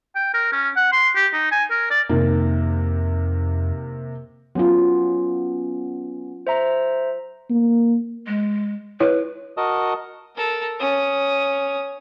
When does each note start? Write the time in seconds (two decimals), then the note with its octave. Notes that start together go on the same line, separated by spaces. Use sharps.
0.15 G5
0.34 A#4
0.52 C#4
0.76 F#5
0.92 C6
1.15 G4
1.33 D#4
1.51 G#5
1.70 A#4
1.90 D5
2.09 F2 C3 D#3 A#3
4.55 F#3 B3 C#4 F4
6.47 C5 E5 A#5
7.50 A#3
8.27 G#3
9.00 E4 B4 C#5
9.57 F#4 A#4 D#5 A5 D#6
10.36 A4 A#4
10.80 C#4 D#6